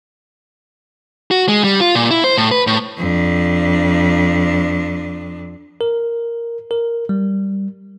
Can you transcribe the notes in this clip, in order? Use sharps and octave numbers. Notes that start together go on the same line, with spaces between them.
F#4
G#3
G3
F4
A#2
E4
C5
A2
B4
A2
F2 D4
A#4
A#4
G3